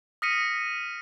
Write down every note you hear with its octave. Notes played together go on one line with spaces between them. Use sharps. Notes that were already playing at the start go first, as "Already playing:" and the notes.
D#6 F6 A#6 B6 C#7 D#7